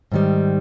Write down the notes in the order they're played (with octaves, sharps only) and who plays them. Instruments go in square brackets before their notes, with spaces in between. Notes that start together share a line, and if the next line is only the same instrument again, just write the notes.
[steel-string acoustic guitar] G#2 D#3 G3